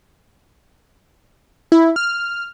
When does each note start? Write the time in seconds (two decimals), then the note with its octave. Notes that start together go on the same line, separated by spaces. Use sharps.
1.72 E4
1.96 F6